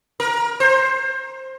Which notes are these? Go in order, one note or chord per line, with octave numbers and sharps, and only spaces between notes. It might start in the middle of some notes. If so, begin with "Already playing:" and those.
A#4
C5